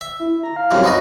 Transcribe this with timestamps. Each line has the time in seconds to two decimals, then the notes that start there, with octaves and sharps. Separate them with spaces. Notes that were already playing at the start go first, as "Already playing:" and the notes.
0.01 E5
0.19 E4
0.43 A#5
0.56 F5
0.71 C2 F#2 C3
0.84 B3 D#4 F#4 D#5